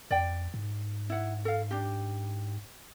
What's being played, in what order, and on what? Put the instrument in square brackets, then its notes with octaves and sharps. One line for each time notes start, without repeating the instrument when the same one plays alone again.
[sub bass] F2 [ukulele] D5 G5
[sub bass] G#2
[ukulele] E4 F#5
A4 F5
D4 G4